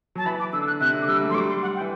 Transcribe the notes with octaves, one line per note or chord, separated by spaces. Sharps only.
F#3 A5
E3 B5
D6
D3 E6
F#6
C3 F#6
D3
D6
G3 E6
A3
F#3 C6
G3 D6
C6
F#5
G5
E3